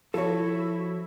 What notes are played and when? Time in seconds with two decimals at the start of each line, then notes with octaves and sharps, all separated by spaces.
0.14 F3 E4 F#4 A4 C#5